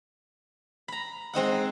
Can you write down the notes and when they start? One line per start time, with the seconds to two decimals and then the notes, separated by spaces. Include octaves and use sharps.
0.88 A#5 B5
1.34 G#3 C4 D#4 F#5